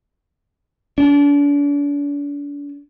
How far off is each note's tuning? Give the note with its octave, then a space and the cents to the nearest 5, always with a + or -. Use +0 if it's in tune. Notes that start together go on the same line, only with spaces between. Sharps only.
D4 -40